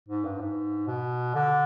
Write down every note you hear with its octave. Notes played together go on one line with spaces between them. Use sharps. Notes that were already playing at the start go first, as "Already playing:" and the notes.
G#2
G2
G#2
B2
D3